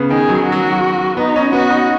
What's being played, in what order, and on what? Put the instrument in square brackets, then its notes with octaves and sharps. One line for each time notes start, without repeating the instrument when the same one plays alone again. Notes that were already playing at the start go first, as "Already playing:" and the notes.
Already playing: [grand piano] C#3 B3
[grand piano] D#3 [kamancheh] G#4
[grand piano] F#3
D#3
[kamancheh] F#4
[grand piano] F#3
[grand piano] B3 [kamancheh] D#4
[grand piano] C#4
[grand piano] B3 [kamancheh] F#4
[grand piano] D#4